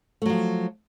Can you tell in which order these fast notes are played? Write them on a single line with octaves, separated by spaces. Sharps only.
A3 F#3 F3